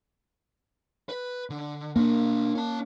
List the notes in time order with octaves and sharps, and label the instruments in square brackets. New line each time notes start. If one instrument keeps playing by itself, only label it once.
[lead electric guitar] B4
D3
[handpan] A#3 [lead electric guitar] D4 A#4
[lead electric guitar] C#4 A5